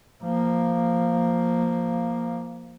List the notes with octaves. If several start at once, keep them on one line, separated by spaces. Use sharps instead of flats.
F3 A#3